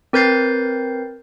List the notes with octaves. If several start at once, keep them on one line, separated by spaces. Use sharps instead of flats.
C4 A#4 B4 G6 A6 C7